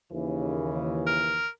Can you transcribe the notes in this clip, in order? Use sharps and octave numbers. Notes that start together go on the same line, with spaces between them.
D#2 C#3 E3
A#4